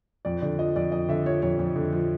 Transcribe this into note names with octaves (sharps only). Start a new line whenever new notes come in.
F2 D5
D3 D5
F3 D#5
F2 D5
F2 D#5
D3 E5
F3 C#5
F2 C#5
F2
D3
F3